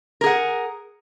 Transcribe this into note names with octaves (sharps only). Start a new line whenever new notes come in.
G#4 A#4 F#5